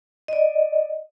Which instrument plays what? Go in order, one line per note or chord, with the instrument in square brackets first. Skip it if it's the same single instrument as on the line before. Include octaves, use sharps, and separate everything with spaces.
[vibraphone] D5 D#5